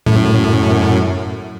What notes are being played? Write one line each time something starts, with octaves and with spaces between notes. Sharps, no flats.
F#2 A2